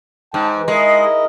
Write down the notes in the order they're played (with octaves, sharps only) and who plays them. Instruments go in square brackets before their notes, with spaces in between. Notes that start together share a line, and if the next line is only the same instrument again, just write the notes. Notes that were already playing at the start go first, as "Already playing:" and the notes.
[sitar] G#2 [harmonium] G5 A5
[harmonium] E3
[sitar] G#3 [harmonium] E4 A#4 D#5